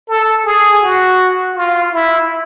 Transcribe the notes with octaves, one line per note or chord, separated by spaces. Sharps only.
A4
G#4
F#4
F4
E4